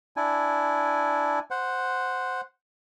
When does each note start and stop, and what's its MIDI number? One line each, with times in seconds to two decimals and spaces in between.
0.17 1.39 62
0.17 1.39 64
0.17 1.39 80
1.50 2.41 72
1.50 2.41 78